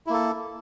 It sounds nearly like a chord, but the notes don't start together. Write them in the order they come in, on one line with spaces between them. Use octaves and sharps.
E4 A#3 A4